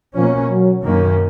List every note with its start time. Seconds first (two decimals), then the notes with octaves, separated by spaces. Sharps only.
0.16 B2 F3 A#3 C#4
0.51 F#3
0.84 F#2 D#3 A#3 C#4